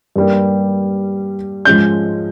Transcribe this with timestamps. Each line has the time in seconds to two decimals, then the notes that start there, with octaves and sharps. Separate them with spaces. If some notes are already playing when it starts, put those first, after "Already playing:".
0.16 G2 G3 A#3
1.65 G#2 F3 G#3 C#4 G6